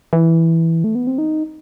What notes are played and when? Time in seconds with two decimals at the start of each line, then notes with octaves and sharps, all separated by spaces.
0.13 E3
0.84 A3
0.95 B3
1.07 C4
1.18 D#4